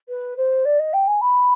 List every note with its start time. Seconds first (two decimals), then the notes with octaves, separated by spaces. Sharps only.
0.09 B4
0.37 C5
0.65 D5
0.79 D#5
0.93 G5
1.07 G#5
1.21 B5